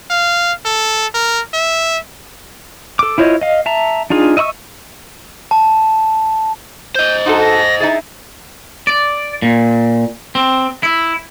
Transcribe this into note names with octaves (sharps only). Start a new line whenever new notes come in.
F5
A4
A#4
E5
A4 D6
E4 F4 C5 C#5 D#5
D#5 F5
E5 A5 A#5
D4 D#4 F4 G#4
D#5 E5 B5 C#6 E6
A5
C5 D#5 G6
D#4 F#4 A4 C6
A#6
D#4 E4 G#4 A6
D5
A#2
C4
E4